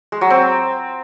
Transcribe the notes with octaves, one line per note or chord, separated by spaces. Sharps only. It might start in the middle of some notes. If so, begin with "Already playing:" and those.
G#3
F#3
C4